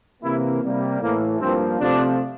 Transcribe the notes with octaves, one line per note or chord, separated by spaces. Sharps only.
C3 E3 A#3 E4
C3 G3 A#3
A2 E3 A3 A#3
G2 F3 A#3 C4
C3 F3 A3 D4